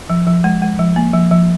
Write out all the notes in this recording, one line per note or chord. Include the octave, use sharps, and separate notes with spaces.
F3
F3
G#3
G#3
F3
A#3
F3
F3